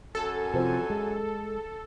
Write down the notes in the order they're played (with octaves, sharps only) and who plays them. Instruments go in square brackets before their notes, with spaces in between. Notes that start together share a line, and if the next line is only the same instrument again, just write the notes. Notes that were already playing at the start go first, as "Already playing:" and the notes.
[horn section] F#2 G#5 [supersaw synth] A4
[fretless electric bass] C3 [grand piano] F3 C4
[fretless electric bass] G#3 [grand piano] G#4